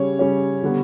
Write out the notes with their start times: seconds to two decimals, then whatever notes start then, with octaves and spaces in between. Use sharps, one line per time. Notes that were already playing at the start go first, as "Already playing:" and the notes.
Already playing: C#3 G3 C#4 C#5
0.19 C#3 G3 C#4
0.63 D3 G3 B3